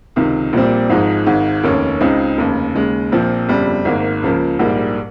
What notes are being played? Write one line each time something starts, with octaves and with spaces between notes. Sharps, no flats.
C#2 C3 D#3
A#1 A#2 G3 C4
G#1 G#2 F3 G#3 D#4
G#1 G#2 D#3
F1 D#2 D#3 A#3 C#4
C#2 C#3 G#3 C4 D#4
F1 D#2 C#3
D#2 C#3 G#3
A#1 A#2 F3 C4
G1 F2 C#3 G3
G#1 G#2 D#3 A#3
C#2 C#3 F3 A#3
A#1 G#2 G3 A#3